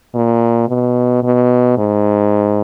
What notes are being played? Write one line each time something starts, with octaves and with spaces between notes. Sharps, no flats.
A#2
B2
B2
G#2